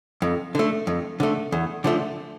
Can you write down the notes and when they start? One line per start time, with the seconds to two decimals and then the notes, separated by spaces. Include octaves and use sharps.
0.22 F2
0.55 D3 A3
0.87 F2
1.20 D3 A3
1.52 E2
1.84 D3 F3 A3